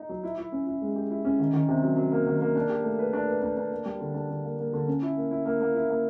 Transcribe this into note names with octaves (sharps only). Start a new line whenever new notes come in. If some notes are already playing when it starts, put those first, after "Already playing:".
Already playing: D#4
F#3
E4
E4
C#4
E4
G#3
G4
E4
C#4
D#3
D#3
C3
F#3
F#3
A#3
D#3
A#3
D4
G4
A3
B4
D4
B4
D4
D4
A#3
G3
D3
D4
D3
A#3
A#3
D3
C#4
E4
A#3
E4
A#3
A#3
E4
A#3